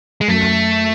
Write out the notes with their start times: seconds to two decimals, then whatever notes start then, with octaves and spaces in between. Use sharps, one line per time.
0.21 G#3
0.28 F#2 A3